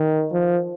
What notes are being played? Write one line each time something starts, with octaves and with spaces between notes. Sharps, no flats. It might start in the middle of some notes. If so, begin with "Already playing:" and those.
Already playing: D#3
F3